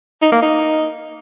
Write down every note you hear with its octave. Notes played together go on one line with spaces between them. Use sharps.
D#4
A#3
D#4